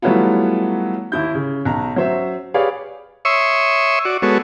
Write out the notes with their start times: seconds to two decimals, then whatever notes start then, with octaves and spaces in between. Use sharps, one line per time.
0.02 E3 F#3 G3 A3 B3 F4
1.12 D#2 E4 G6
1.34 C#3
1.65 B1 A#5
1.96 F#3 C#4 C5 E5
2.54 G4 G#4 B4 C#5 D5 F5
3.25 C#5 E5 C6 C#6 D#6 E6
4.05 F#4 D5
4.22 G#3 B3 F#4 A4 C#5